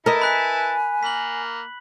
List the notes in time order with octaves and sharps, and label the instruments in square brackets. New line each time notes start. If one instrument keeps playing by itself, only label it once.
[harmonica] E4 B4 A5 [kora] A#4 D#5
[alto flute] G#5 [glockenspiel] B5 F#6 B6
[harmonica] A#3 [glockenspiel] B6 F#7